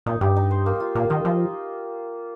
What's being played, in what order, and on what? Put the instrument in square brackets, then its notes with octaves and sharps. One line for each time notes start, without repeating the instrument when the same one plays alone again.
[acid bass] A#2 [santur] D#4
[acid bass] G2 [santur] G4
[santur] D#4
C5
A#3
F4
[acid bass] A#2 [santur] A#3
[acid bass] D#3 [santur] D#5
[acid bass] F3 [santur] D#4